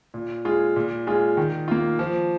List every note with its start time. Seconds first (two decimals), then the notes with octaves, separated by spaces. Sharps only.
0.14 A#2
0.45 G#3 F4 G#4
0.76 A#2
1.07 G#3 F4 G#4
1.37 D#3
1.68 A#3 F4
1.99 F3